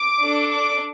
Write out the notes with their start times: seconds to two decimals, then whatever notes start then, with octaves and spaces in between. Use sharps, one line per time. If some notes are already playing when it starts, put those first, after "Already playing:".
Already playing: D6
0.23 D4 A4
0.51 D6